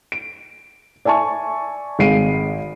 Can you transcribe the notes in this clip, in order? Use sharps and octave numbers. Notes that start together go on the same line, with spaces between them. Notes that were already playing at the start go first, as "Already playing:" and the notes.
D7
D5 E5 G#5 A5 C#6
G#1 G#3 F5 C7 D7 D#7